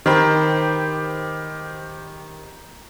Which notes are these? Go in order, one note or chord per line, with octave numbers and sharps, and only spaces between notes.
D#3 G4 C5 B5